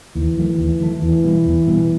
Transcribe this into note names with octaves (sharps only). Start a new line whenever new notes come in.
D#2 E3
D#3 F#3 A3
D#2
D#3 F#3 A3
E2 E3
B2 G3 B3
E2
B2 G3 B3